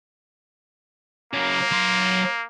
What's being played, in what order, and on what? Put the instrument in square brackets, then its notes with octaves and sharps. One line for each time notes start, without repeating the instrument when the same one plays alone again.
[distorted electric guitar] C#3 F#3 [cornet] A#3
[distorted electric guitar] F#3 C6